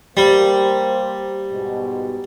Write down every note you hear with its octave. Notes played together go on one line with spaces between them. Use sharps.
G3 A#3 C5
G#2 B2